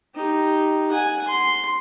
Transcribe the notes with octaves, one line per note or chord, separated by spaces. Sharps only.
D#4 G4
F#5 G#5
C6